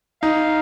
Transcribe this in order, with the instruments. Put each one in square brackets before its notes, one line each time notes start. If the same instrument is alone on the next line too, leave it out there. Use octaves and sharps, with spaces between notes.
[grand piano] D#4 [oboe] F5